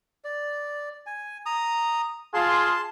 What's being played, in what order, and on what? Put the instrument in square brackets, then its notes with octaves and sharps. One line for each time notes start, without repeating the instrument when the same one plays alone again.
[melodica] D5
G#5
A#5 D#6
[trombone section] F4 G#4 [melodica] A5 C6